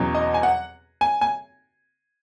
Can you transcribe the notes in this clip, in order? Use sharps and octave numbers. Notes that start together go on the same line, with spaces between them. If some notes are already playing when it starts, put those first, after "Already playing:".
Already playing: E2 B2 F#3 C#4
D#5
G#5
F#5
G#5
G#5